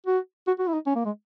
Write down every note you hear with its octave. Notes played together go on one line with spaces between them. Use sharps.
F#4
F#4
F#4
E4
D#4
C#4
A#3
G#3